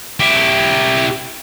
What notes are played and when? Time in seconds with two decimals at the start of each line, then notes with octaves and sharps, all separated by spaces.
0.20 E4 G4